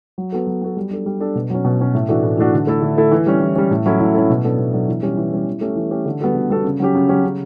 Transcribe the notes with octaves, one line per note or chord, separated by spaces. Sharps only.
F#3
B3 F#4 A4
F#3
B3 F#4 A4
G3
D4 A4
G3
D4 A4
B2
F#3 C#4
B2
F#3 C#4
A2
E3 A3 D4 F#4
A2
E3 A3 D4 F#4
D3
A3 E4 A4
D3
A3 E4 A4
E3
G3 C#4
E3
G3 C#4
A2
F#3 C#4 E4 A4
A2
F#3 C#4 E4 A4
B2
F#3 B3 D4 A4
B2
F#3 B3 D4 A4
E3
G3 C#4 G4
E3
G3 C#4 G4
E3
A3 C#4 G4
E3
A3 C#4 G4
D3
G3 B3 F#4 A4
D3
G3 B3 F#4 A4
C#3
F#3 C#4 G4
C#3
F#3 C#4 G4
C#3